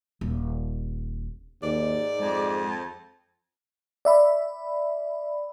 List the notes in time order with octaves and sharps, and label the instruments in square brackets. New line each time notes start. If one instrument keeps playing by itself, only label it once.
[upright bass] D#1
[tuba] D#2 [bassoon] G#2 [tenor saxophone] D5
[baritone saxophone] F2 [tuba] G#3
[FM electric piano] D5 E5 B5